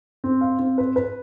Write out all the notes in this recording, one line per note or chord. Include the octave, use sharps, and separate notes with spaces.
C4
F5
C4
B4
B4